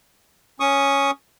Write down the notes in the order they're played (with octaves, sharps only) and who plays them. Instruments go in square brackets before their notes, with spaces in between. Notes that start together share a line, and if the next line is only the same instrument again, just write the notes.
[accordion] C#4 C#6 D#6